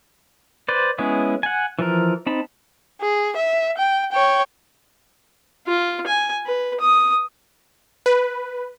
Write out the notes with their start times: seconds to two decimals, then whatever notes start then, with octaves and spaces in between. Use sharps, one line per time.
0.69 B4 C5 D5
0.98 G#3 B3 C#4 E4 G#4
1.43 F#5 G#5
1.79 E3 F3 A#4
2.26 C4 D#4 A5 B5
3.01 G#4
3.36 E5
3.77 G5
4.11 C#5 G5
5.67 F4
6.07 G#5
6.46 B4
6.80 D#6
8.06 B4